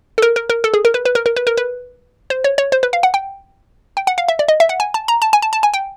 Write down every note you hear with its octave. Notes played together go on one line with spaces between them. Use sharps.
A4
A#4
A#4
A#4
A4
G#4
A#4
B4
B4
A#4
A#4
B4
A#4
B4
C5
C#5
C#5
C5
B4
F5
F#5
G5
G5
F#5
F5
E5
D5
D#5
E5
F#5
G#5
A5
A#5
A5
G#5
A5
A5
G#5
G5